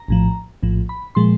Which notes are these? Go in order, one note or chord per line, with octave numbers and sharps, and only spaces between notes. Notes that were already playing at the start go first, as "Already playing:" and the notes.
Already playing: A#5
A#1 A2 F3
A#1 A2 F3
B5
A#2 F3 G#3 C6